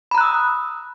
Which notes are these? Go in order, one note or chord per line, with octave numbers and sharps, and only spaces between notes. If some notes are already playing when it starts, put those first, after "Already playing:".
A#5 B5 D#6 E6 F#6